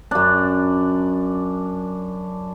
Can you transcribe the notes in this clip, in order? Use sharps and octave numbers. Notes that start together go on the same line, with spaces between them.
F#2 D4